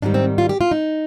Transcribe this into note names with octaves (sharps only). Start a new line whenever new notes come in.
G#2 D#3 G3 C4 D4
C4
F4
G4
F4
D#4